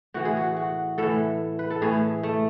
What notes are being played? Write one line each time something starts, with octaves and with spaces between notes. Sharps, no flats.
A2 E3 F#4
G#4
F#4
F#4
A2 E3 A4
B4
A4
A2 E3 G#4
A3